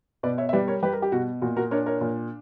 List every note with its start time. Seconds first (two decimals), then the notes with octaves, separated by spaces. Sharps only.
0.23 B2 B4 D5
0.38 C#5 E5
0.49 E5
0.53 G3 B4 D5
0.68 A#4 C#5
0.83 G3 G4 B4
0.93 A#4
1.02 G4
1.12 B2 F#4
1.42 A#2 F#4
1.57 F#4 A#4
1.71 D4 A#4 C#5
1.86 A#4 C#5
2.01 A#2